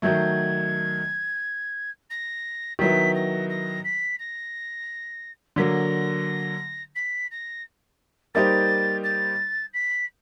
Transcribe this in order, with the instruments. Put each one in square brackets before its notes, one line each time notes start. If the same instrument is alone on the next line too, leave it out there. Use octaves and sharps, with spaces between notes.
[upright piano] D#3 F#3 A3 [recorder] G#6
[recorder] A#6
[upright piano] D#3 F#3 B3 E4 [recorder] B6
[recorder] A#6
A#6
B6
A#6
[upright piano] D3 F#3 A#3 [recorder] A#6 B6
[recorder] B6
A#6
[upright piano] G3 A#3 D#4 G4 C5 [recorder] A6
[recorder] A6
B6